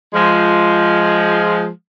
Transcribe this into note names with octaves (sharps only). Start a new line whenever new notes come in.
F3 G#3